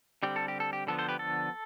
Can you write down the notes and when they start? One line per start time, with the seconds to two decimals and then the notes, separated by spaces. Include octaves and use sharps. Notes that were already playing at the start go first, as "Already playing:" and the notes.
0.23 D3 G3 C4 G4
0.36 A4
0.48 G4
0.60 A4
0.73 G4
0.87 D3 F3 B3 A4
0.98 A4 C5
1.08 G4 B4
1.19 A4